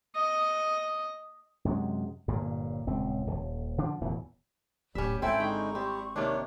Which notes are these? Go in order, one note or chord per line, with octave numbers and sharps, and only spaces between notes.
D#5
F#2 C3 G#3
G1 G2 A#2
D#1 C#2 C4
D#1
D3 F3 D4
D1 E2 B2 E3
D1 G3 C#4 G4 E5
G#1 C4 E4 A4 E5 G5 G#5
D3 G#3 D#4 G5 C#6
G3 C4 G4
C3 D#3 A#3 D4 C#5